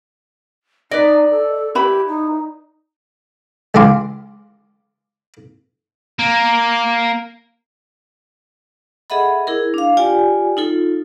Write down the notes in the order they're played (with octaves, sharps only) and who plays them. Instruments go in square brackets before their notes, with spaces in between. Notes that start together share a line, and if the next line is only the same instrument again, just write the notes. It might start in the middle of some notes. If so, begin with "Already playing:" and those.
[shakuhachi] D#4 [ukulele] B4 D#5 [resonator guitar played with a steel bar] D5
[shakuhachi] A4
[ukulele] E4 B4 B5 [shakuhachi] G4
[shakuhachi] D#4
[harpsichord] C#2 G#2 E3 G4 F5 C6
[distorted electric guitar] A#3
[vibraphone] G#4 A4 D#5 E5 F#5 B5
E4 G#4 A#4
D4 F5
F4 G4 D5 G5 G#5
D#4 F4 A4